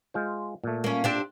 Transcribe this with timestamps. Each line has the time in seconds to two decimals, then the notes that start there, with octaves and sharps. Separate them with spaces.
0.14 G#3 F4 C5
0.64 A#2 A3
0.84 A#3 C#4
1.04 C4 D4 G4